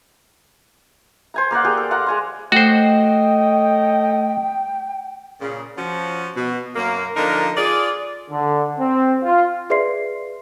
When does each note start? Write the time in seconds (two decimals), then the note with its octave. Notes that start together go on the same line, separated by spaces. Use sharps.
1.34 C5 G#5 A#5
1.51 A#3 A#4 D5 F#5
1.65 G4 G#4 G5
1.77 A4
1.91 F5 F#5 A#5
2.07 G#3 G#5 C6
2.52 A3 F#4 A4 C5 C#5 D#5 G5
5.41 A#2 C#3
5.77 F3 C#4 F#4
6.36 B2
6.76 F#2 A#3
7.17 D3 F3 A#3 D4 D#4 A#4
7.57 F4 G#4 D5
8.31 D3
8.78 C4
9.24 F4
9.70 G#4 B4 D5 E5 C6 C7